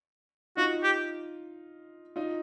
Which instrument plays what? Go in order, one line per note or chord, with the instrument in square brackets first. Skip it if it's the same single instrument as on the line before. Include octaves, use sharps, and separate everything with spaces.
[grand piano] D#4 F4 [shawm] F#4
[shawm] G4
[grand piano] D#4 F4